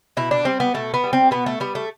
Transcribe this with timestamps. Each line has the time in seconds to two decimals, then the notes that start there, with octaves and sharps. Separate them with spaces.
0.17 B2 E4
0.31 D4
0.45 G3 C4
0.60 B3
0.74 B2 A3
0.94 B3
1.04 G3
1.13 C4
1.31 B2 B3
1.46 A3
1.60 G3 B3
1.75 A3